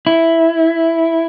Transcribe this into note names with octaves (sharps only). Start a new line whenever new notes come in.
E4